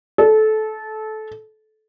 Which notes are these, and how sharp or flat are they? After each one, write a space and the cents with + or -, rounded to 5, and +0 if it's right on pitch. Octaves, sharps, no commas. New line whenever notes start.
A4 -20